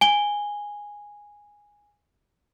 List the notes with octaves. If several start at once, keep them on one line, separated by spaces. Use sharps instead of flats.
G#5 G7